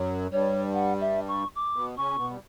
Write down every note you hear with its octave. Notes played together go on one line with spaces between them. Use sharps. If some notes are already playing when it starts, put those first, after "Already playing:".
Already playing: F#2 F#3
G2 G3 C#5
F#5
E5
C#6
D6
B2 B3
C#3 C#4 C#6
B2 B3
G3